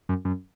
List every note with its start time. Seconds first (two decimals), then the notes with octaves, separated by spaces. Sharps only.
0.09 F#2
0.25 F#2